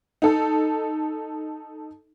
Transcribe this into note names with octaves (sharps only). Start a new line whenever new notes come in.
D#4 A4